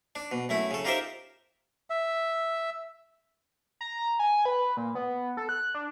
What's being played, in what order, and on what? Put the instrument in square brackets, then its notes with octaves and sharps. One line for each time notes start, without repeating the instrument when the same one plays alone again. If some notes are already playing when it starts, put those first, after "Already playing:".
[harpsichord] D4
B2
F#2 A3 E4
C#3 A4
D#4 F4 G4 A#4 C5 E5
[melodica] E5
[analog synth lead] A#5
G#5
B4
A#2
B3
A4
F#6
D4